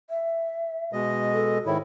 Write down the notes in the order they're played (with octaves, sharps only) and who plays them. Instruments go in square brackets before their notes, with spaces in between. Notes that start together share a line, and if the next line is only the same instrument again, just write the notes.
[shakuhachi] E5
[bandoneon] B2 G#3 D#5
[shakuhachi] A4
[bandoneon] G#2 D#3 E4 [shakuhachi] C#5